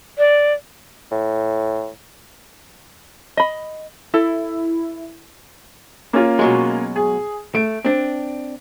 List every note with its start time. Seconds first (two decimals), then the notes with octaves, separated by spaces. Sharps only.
0.18 D5
1.11 A2
3.37 D#5 B5
4.14 E4 A4
6.13 A#3 C#4 F4
6.39 B2 F#3 G#3
6.96 G#4
7.55 A3 D7
7.85 C4 D4